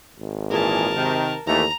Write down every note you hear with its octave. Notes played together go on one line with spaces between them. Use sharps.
G#1
A#2 E3 G#4 A#4 A5
C3 D#3
D#2 D#3 E3 A3 A#5